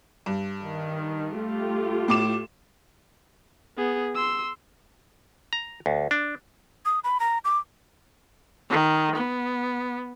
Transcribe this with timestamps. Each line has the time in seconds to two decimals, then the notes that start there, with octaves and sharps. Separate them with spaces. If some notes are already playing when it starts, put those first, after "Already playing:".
0.26 G2
0.63 D#3
1.36 A3 F4 G4
2.08 A2 D6 E7
3.78 B3 G#4
4.15 C6 E6
5.53 A#5
5.86 D2
6.11 D4
6.85 D#6
7.04 B5
7.20 A#5
7.45 D6
8.70 D#3
9.15 B3